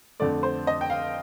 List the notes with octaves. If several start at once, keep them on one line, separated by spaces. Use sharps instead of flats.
F2 D3 A3 C4 D5
C5
D#5
G5
F5